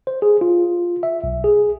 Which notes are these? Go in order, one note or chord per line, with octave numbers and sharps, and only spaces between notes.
C5
G#4
F4
E5
B1
G#4